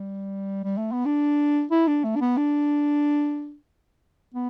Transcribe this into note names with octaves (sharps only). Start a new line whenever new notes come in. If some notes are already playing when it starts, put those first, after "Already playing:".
Already playing: G3
G3
A3
B3
D4
E4
D4
A3
D4
B3
D4
B3